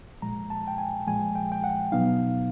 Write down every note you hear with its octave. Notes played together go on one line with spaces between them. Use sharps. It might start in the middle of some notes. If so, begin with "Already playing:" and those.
A#2 F3 G#3 A#5
A5
G5
G#5
A#2 F3 G#3 G#5
G5
G5
F#5
B2 F#3 B3 D#4 F5